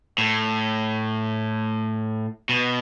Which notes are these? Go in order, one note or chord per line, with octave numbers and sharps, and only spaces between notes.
A2
B2